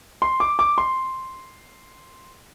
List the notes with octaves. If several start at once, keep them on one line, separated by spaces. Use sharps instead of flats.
C6
D6
D6
C6